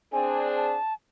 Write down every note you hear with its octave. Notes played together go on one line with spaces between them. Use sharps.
C4 D4 G#4 G#5
A5